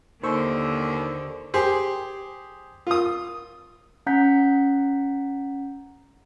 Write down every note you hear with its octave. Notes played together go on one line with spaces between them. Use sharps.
D#2 D3 D#3 C5 C#6 E6
G4 G#4 C5
F4 D#6
C#4 F#5 A#5 G6 B6